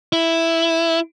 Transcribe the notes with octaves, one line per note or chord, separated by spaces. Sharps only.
E4